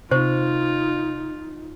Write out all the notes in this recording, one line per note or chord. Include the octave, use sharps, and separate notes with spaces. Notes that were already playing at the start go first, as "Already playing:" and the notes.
C3 D#4 F4 C5 C#6